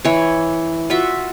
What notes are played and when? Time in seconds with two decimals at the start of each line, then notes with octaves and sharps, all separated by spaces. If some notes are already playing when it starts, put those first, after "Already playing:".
0.05 E3 C#5
0.90 F4 F#4 E5